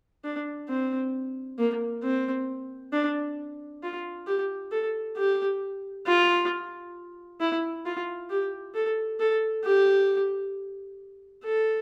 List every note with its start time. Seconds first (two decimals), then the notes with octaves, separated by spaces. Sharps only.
0.24 D4
0.69 C4
1.59 A#3
2.03 C4
2.93 D4
3.83 F4
4.27 G4
4.72 A4
5.17 G4
6.07 F4
7.41 E4
7.85 F4
8.30 G4
8.75 A4
9.20 A4
9.65 G4
11.44 A4